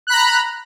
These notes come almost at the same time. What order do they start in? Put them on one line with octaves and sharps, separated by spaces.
F#6 B5 A#5